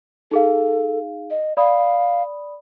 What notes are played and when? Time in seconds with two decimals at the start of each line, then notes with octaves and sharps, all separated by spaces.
0.31 D#4 G#4 A4 F5
1.31 D#5
1.57 D5 F5 B5 D#6